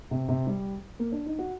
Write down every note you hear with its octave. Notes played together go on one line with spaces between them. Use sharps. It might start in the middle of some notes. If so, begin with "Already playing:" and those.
C3
C3
G3
A#3
D4
D#4
F#4